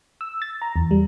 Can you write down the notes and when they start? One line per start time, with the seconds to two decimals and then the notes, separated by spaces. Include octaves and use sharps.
0.21 E6
0.42 A6
0.62 A#5
0.76 E2
0.91 G3